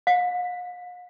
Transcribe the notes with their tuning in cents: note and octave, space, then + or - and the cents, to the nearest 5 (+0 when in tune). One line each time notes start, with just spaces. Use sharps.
F5 +45